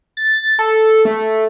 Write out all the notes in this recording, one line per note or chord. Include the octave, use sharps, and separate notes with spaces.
A6
A4
A3